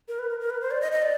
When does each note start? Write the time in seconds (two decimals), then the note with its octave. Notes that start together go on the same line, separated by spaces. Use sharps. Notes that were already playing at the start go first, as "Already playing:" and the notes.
0.08 A#4
0.19 B4
0.30 A#4
0.40 A#4
0.50 B4
0.61 C5
0.71 D5
0.81 D#5
0.92 D#5
1.02 D5